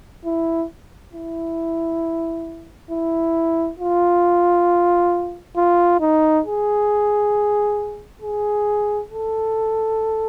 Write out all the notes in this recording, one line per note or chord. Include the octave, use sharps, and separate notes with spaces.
E4
E4
E4
F4
F4
D#4
G#4
G#4
A4